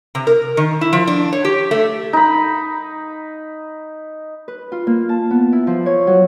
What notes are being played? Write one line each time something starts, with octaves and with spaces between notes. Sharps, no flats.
C3
A#4
D#3
E4
F3
D4
C#5
G4
A3
D#4 B5
B4
F4
A#3
A5
B3
E4
F3
C#5
F#3